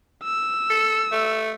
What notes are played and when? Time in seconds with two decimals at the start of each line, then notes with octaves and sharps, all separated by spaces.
0.24 E6
0.70 A4
1.12 A3